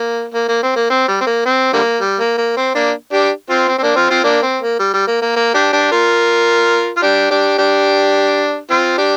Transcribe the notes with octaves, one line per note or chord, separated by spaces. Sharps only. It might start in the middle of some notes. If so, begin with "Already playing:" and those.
Already playing: A#3
A#3
A#3
C4
A#3
C4
G3
C4
A#3
C4
D3 G3 A#3
G3
A#3
A#3
C4
A#3 D4
D4 G4
C4 F4
C4
C4
A#3 D4
C4 F4
C4 F4
A#3 D4
C4
A#3
G3
G3
A#3
A#3
A#3
D4 G4
D4 G4
F4 A#4
F4
D4 G4
D4 G4
D4 G4
C4 F4
D4 G4